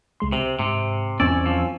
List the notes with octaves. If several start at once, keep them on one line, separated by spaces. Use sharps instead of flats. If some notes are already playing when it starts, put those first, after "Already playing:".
C#2 G#3 C6
C3 C5
G#2 C3
E2 C4 C#4 D5 G#5 C#6 E6
F3